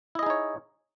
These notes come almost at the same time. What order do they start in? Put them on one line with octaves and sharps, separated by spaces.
E4 D#5 G#4 D#4 C#5